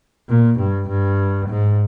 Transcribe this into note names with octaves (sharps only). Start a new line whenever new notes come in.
A#2
G2
G2
G#2